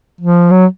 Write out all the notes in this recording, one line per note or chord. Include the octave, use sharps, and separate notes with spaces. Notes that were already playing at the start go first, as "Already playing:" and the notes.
F3
F#3